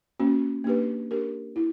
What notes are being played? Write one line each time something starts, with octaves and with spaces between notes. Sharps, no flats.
A#3 C#4 F#4
A#3 D4 G4 B4
D4 G4 A#4
E4